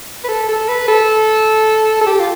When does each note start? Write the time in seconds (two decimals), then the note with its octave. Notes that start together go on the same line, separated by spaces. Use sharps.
0.24 B4
0.29 A4
0.49 A4
0.68 B4
0.88 A4
2.01 A4
2.06 G4
2.20 F4